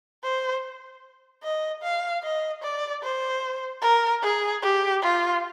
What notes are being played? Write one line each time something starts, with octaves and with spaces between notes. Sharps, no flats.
C5
D#5
F5
D#5
D5
C5
A#4
G#4
G4
F4